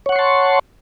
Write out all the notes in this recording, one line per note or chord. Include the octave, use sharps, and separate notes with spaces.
C#5 F#5 A5 C6 C#6